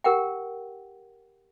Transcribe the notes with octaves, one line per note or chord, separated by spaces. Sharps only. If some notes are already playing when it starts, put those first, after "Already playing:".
G4 A#4 F#5 G5